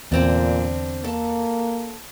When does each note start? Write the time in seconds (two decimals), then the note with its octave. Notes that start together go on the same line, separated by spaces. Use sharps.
0.12 E2 A#2 D3 C4 D4
1.04 A#3 A4 A5